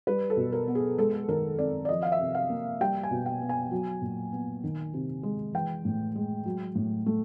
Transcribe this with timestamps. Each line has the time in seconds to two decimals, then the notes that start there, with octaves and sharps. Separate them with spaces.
0.07 G3 B4
0.30 A4
0.37 B2
0.52 A#4
0.68 B3
0.75 G#4
0.98 G#3 A4
1.29 D#3 A#4
1.58 C4 D5
1.85 D5
1.89 F3 D#5
2.03 F5
2.12 E5
2.19 C3
2.35 F5
2.50 A#3
2.81 G3 G5
3.03 G#5
3.11 B2
3.26 G5
3.42 B3
3.49 G#5
3.71 F#3
4.02 A#2
4.32 B3
4.64 D#3
4.93 C3
5.23 G#3
5.54 E3 G5
5.85 A2
6.15 G#3
6.46 F#3
6.75 A2
7.06 A3